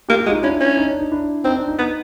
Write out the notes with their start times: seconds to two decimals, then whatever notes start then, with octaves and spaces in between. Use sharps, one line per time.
0.08 A#3 F4 G4
0.20 F4 G4
0.26 G#3 F#4
0.31 D#4 F4
0.43 C#4 D4 E4
0.60 C#4
0.77 D#4
0.89 D4
0.99 D#4
1.11 D4 E4
1.44 C4 D#4
1.57 D4
1.68 D#4
1.79 B3 D#4